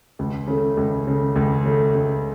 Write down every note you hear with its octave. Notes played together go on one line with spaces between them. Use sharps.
C#2
C#3 A3
C#2
C#3 A3
C#2
C#3 A3
C#2